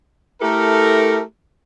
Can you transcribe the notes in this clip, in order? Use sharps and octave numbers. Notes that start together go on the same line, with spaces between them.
A3 E4 G4 A4 A#4